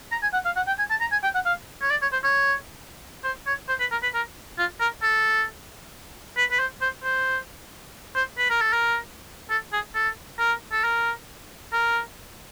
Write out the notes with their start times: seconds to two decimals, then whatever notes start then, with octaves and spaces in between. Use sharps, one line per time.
0.12 A#5
0.23 G#5
0.33 F#5
0.45 F5
0.56 F#5
0.67 G5
0.79 G#5
0.90 A5
1.01 A#5
1.12 G#5
1.23 G5
1.35 F#5
1.46 F5
1.82 C#5
1.90 D5
2.02 C#5
2.12 C5
2.24 C#5
3.24 C5
3.47 C#5
3.69 C5
3.80 B4
3.91 A#4
4.03 B4
4.14 A#4
4.58 F4
4.80 A#4
5.03 A4
6.37 B4
6.51 B4
6.59 C5
6.82 C5
7.04 C5
8.16 C5
8.38 B4
8.50 A#4
8.62 A4
8.73 A#4
9.50 A4
9.72 G#4
9.94 A4
10.39 A#4
10.72 A4
10.84 A#4
11.73 A#4